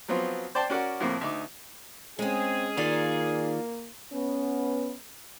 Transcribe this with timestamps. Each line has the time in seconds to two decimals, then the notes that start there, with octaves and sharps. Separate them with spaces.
0.08 F3 F#3 B3 C4 F4
0.55 C5 D5 G5 A5 C6
0.70 C#4 F#4 A#4 D5 F#5
1.00 F2 A2 F3 A#3
1.21 D2 D#4 D6
2.19 G#3 C4 C#4 G#4
2.77 D#3 A#3 F4 D5 F5
4.13 B3 C#4